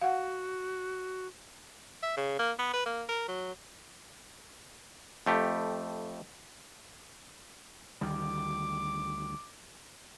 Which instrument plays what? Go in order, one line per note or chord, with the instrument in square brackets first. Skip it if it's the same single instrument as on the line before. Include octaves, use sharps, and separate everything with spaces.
[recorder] F#4 [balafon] F5 F#5
[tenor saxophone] E5
C#3
A#3
B3
B4
A#3
A#4
F#3
[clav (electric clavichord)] F2 A3 G4
[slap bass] D2 D#3 G3 [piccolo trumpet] D6